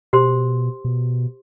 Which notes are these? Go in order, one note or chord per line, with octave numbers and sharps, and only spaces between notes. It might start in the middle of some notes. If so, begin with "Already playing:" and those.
B2 G4 C5 C6
B2